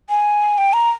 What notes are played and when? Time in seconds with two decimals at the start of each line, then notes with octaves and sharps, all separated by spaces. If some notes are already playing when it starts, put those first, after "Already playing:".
0.09 G#5
0.58 G5
0.73 A#5